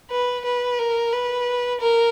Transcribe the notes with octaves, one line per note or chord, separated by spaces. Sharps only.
B4
B4
A#4
B4
A#4